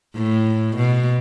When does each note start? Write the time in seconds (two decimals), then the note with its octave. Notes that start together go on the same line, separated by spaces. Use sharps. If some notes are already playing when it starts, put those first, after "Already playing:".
0.16 A2
0.77 B2